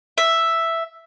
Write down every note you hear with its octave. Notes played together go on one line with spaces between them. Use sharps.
E5